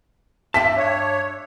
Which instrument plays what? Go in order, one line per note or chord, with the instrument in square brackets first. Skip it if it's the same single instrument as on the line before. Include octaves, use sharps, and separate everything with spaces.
[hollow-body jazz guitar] G2 G5 A5 [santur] E5 [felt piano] B6
[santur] D4 [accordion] C#5